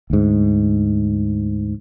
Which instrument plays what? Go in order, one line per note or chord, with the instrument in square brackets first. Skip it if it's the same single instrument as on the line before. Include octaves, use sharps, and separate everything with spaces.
[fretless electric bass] D2 G#2